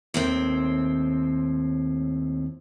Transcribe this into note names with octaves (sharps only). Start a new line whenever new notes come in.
D#2 A2 C4